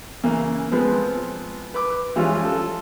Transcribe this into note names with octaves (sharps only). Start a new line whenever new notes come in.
C#3 E3 A#3
F3 G#3 B3 C4 B4
B4 D6
E3 F3 G3 G#3 C#4 F4
F4 A4